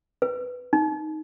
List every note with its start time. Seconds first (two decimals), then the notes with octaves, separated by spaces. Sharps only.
0.22 B4
0.73 D#4